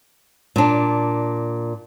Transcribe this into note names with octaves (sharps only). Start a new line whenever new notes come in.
A#2 D4